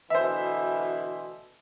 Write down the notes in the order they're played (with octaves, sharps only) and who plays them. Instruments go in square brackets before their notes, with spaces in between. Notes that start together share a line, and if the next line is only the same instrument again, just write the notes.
[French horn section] D2 B2 E3 [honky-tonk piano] C5 E5